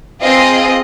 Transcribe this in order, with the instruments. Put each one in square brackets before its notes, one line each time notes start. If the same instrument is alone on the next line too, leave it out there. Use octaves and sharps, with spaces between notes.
[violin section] C4 F4 G#4 D#5